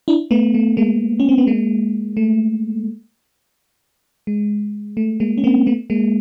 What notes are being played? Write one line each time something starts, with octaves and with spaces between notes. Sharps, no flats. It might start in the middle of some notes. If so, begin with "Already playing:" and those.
D4 E4
A3 B3
A3
G#3 A#3
C#4
C4
B3
G#3 A#3
A3
G#3
A3
G#3 A#3
C#4
A#3 C4
A3 B3
G#3 A#3